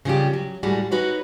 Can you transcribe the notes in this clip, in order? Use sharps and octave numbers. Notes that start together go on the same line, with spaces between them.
C#3 F3 G3 F4 G4
F#3
A2 G3 G#3 F#4
D#4 F#4 B4 C#5